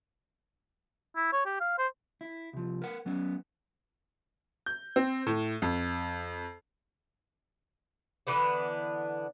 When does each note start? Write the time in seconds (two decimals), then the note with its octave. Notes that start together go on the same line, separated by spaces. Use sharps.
1.16 E4
1.33 C#5
1.45 G4
1.60 F5
1.78 C5
2.21 E4
2.53 C2 F3
2.82 A#4 B4 F#5
3.06 F#3 B3 C#4
4.66 G6
4.96 C4
5.26 A2
5.62 F2
8.27 D3 E3 B3 D4